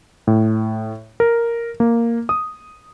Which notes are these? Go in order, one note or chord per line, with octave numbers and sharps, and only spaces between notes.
A2
A#4
A#3
D#6